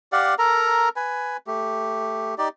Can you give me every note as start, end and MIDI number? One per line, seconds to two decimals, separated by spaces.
0.12 0.35 67
0.12 0.35 74
0.12 0.35 77
0.12 0.35 78
0.39 0.89 69
0.39 0.89 70
0.39 0.89 82
0.96 1.37 71
0.96 1.37 80
1.47 2.35 57
1.47 2.35 67
2.38 2.49 63
2.38 2.49 67
2.38 2.49 74